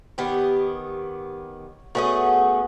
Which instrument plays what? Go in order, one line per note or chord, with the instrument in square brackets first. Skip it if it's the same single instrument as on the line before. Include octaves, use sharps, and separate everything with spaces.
[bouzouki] D#3 B3 G4 [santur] C#5
[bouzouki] A3 C#4 G#4 [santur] B3 F#4 F#5